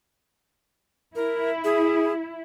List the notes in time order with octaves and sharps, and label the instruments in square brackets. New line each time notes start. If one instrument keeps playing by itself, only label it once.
[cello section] E4 [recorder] A#4
[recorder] G#4